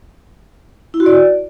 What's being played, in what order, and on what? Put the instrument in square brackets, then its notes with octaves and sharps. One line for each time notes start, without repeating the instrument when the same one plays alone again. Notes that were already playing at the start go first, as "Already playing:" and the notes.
[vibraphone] E4
F#4
D5